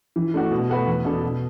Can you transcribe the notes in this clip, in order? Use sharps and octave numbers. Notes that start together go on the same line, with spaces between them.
E3
A3 D4 F#4
B2
A3 F#4 B4
E2
B2 B3 D4 A4
B2